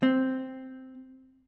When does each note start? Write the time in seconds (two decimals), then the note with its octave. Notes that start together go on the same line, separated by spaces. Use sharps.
0.03 C4